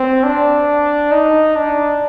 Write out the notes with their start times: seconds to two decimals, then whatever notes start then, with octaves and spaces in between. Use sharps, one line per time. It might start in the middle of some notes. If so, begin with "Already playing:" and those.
Already playing: C4
0.24 D4
1.12 D#4
1.56 D4